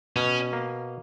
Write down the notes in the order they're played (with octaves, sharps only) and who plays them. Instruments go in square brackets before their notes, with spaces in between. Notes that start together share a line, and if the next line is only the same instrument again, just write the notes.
[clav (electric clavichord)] B2 [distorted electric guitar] C#4
[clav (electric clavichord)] A#3